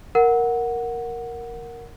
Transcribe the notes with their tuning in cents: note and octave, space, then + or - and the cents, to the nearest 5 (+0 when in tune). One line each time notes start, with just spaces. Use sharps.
A#4 +0 F#5 -5